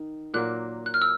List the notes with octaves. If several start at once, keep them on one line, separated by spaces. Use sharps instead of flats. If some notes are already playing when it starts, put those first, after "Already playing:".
Already playing: D#3
A#2 F#3 A#3 F#6
F#6
F6
E6